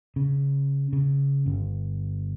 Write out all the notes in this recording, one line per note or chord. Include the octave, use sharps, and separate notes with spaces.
C#3
C#3
G1